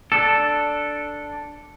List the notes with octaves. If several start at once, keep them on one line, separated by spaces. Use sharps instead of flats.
D4 A4